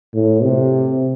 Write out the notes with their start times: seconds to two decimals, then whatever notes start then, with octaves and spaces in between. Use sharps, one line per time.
0.14 A2
0.43 C3